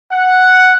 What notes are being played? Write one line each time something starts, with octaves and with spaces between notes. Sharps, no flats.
F#5